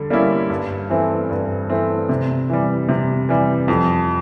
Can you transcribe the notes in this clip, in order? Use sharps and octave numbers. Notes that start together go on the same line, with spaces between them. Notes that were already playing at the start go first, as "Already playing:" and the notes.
Already playing: D3 G3
G3 A#3 C#4 E4
G2
E3 A3 C4
G2
E3 A3 C4
C3
E3 G3
C3
E3 G3
F2